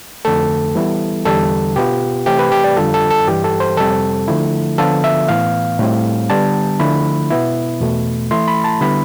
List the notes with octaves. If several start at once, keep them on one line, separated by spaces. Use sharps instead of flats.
F2 D3 A3 A4
E3 G3 B3 E4
E2 D3 G3 A4
B2 B3 F4 G4
C3 E3 A3 C4 G4
B4
G4
D5
F2 D3 G3 D4 F4 A4
A4
A4
G2 E3 G3 G4
A4
C5
F2 C3 G3 C4 A4
D3 F3 A3 E4
D3 F3 B3 F4 A4
E5
A2 E3 B3 F5
A2 G3 C4
D3 G3 B3 D4 A5
D3 F3 A3 E4 B5
B2 B3 E4
E2 B2 A3
E3 A3 E4 C6
B5
A5
D3 G3 B3 E4 B5